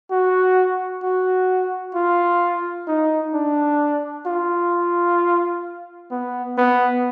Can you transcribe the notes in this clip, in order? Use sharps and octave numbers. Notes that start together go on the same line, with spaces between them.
F#4
F#4
F4
D#4
D4
F4
B3
B3